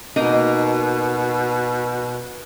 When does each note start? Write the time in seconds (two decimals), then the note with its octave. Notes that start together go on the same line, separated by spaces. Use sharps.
0.16 B2 A#3 D#4 A#4